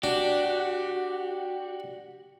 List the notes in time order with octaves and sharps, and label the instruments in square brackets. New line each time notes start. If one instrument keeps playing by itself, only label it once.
[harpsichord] D4 [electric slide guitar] F#4 [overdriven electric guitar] G4